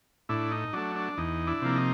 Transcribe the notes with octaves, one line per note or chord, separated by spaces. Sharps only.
A2 D4 E4
D#4
F#3 A3 D4
D4
E2 D#4
D4 E4
C3 F3 A#3
D#4